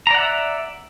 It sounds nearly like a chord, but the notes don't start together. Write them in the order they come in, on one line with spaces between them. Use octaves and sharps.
A#5 D5 F#5 E5